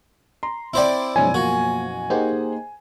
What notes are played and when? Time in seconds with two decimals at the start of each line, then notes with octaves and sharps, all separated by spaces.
0.43 A#5 C6
0.74 C4 E4 C5 D5 G5
1.16 F#1 B2 F3 G#3 C#4 D#4 G#5
1.34 A#3 F4 F#4
2.10 A#3 D#4 G4 G#4 C5 F#5